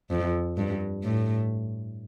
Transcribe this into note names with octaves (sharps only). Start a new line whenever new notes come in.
F2
G2
A2